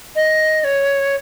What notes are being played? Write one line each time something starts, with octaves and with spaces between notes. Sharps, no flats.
D#5
C#5